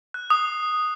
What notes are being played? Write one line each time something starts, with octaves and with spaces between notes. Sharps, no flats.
F#6
D#6